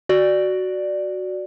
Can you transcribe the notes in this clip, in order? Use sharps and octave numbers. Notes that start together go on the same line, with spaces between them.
F#4 D5